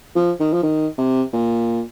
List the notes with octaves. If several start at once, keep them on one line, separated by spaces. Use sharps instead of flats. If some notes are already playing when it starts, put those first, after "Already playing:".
F3
D#3
F3
D#3
C3
A#2